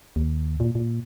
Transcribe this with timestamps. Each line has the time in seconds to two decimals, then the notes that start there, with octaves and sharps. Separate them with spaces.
0.16 D#2
0.60 A#2
0.75 A#2